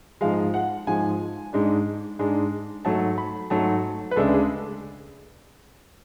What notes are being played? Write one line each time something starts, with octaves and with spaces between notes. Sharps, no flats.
G#2 F3 G#3 F5
F#5
G#2 F3 G#3 G#5
G#2 G#3 D4
G#2 G#3 D4
G#2 F#3 A3 A5
B5
G#2 F#3 A3 A5
B4
D2 C#3 G#3 D4 A4
G#4